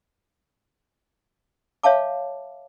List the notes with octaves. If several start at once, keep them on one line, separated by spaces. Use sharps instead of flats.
C#5 E5 F5 A5 D6